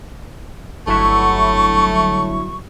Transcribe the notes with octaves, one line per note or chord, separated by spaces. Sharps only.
G1 F#3 A3 E4 C#6